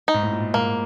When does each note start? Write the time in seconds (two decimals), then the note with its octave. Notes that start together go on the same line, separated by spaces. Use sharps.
0.08 D#4
0.14 G#2
0.23 A2
0.32 A#2
0.54 G#2 A#3